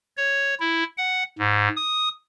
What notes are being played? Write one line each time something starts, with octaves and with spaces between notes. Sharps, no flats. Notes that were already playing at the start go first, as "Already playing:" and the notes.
C#5
E4
F#5
G#2
D#6